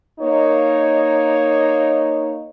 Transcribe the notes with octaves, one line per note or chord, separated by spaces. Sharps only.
A#3 D#4 C#5